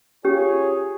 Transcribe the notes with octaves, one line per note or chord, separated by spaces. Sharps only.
C#4 F4 G4 G#4 C#5